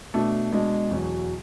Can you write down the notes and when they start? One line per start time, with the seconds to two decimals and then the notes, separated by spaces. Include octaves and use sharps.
0.14 B2 A3 D4
0.53 B2 G#3 D4
0.91 E2 B2 F#3